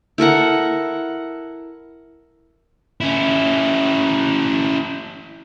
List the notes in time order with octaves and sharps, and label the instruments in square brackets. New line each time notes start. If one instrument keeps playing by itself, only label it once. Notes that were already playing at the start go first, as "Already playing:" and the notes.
[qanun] E4 A4 A#4 F#5
[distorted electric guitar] C#4 E4